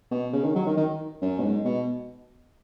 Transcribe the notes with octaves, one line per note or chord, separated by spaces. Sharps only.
B2
C#3
D#3
F#3
D#3
D#3
F#2
B2
G#2
B2